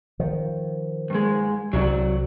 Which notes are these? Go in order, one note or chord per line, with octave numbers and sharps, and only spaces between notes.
D#3 F3
G2 G#3
C2 D3 F#3 C4 F#4 D5